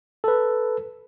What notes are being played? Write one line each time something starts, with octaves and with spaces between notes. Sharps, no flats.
A4 B4